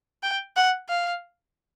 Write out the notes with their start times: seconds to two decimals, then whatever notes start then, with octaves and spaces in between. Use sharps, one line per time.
0.23 G5
0.56 F#5
0.89 F5